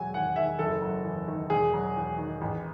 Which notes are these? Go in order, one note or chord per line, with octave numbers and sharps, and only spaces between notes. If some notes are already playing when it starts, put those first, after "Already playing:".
Already playing: E1 F#3 G#5
D#2 F#5
D#3 E5
F#1 A4
F#3
E2
D#3
E1 G#4
F#3
E2
D#3
A1